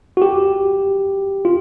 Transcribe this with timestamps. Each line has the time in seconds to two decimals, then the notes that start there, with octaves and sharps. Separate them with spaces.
0.17 F#4
0.22 G4
1.45 F4